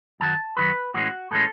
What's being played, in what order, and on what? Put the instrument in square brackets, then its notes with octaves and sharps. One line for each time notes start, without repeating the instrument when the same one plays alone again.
[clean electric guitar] F#2 D#3 F#3 A5
F#2 D#3 F#3 B4
A2 E3 G#3 C#4 F#4
A2 E3 G#3 C#4 A4